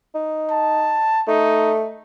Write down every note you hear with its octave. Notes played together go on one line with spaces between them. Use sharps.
D#4
A5
A3 D#4